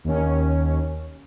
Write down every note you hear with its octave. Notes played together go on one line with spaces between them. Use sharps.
D#2 C#4